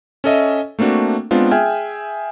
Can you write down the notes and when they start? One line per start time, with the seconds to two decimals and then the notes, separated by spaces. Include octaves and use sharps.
0.24 C#4 A4 D#5 E5
0.79 A3 A#3 C4 D4 F#4
1.31 G#3 B3 C4 D4 F4
1.51 G#4 E5 G5 G#5 F6